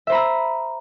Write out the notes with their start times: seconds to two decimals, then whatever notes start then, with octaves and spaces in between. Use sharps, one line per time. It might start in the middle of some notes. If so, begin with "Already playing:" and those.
0.07 E5
0.10 C5
0.12 B5
0.15 A#5
0.17 E6